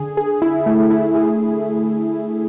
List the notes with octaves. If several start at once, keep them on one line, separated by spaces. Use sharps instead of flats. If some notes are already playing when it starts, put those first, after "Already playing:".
Already playing: D3 G#4
G#4
E4
A3
E4
G#4